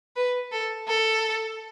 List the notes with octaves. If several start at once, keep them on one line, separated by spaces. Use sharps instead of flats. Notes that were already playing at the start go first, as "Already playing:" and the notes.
B4
A4
A4